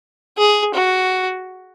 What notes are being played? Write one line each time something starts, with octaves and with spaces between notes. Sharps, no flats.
G#4
F#4